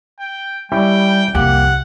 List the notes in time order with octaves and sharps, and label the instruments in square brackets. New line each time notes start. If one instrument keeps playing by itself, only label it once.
[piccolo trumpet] G5
[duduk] G3 [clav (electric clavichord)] C#4 E4 G4 [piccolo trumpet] G5
[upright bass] C2 F2 [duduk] A#3 [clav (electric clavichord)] G4 [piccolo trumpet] F#5